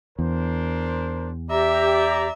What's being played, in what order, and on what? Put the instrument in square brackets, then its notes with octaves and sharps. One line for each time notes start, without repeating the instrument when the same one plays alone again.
[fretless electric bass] E2 [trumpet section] D4 A#4 C5
[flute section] G4 [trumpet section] D5 A#5 [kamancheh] E5